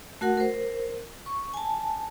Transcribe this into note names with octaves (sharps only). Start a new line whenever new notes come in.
A3 F#4 A#4 F#5
A#4 C5
C#6
G#5 A5